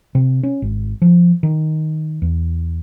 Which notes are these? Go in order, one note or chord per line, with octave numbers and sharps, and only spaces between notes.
C3
C#4
G#1
F3
D#3
E2